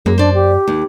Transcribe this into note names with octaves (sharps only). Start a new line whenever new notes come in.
F#2 A#3 G#4
D4 C5 D5
G4
D#2